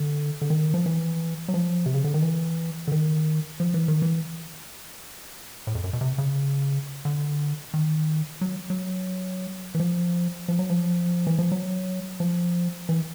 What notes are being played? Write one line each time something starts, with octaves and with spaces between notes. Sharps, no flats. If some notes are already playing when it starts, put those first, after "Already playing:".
Already playing: D3
D3
D#3
F3
E3
F#3
F3
C3
C#3
D3
D#3
E3
D3
D#3
F3
E3
D#3
E3
A2
F2
F#2
B2
C3
C#3
D3
D#3
F#3
F#3
E3
F3
F3
F#3
F3
E3
F3
F#3
F3
E3